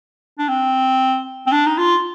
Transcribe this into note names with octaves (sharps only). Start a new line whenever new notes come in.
D4
C4
C4
D4
D#4
F4